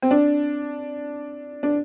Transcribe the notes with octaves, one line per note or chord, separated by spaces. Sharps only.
C4
D4
D4